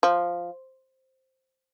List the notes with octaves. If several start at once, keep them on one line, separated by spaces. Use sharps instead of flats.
F3